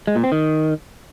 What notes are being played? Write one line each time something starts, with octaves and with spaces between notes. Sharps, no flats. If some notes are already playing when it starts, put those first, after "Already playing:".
G#3
A#2
C4
D#3